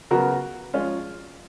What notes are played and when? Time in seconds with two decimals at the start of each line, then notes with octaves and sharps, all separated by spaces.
0.11 C#3 F#3 B3 F#4 A#4
0.74 F3 G#3 C#4 F4